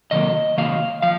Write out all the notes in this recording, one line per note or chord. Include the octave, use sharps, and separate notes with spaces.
C3 D#3 F#3 A#3 D#5
C3 D#3 F#3 A#3 F5
F3 F5